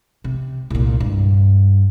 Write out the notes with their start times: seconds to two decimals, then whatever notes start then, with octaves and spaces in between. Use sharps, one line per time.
0.24 C3
0.70 C2 A#2
1.00 G2